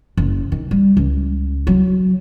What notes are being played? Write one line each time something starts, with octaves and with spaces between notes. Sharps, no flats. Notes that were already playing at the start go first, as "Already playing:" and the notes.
F#1
D#3
G3
C#2
F#3